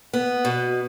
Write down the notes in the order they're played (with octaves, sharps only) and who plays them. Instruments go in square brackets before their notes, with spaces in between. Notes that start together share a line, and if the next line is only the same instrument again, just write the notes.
[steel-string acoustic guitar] B3
B2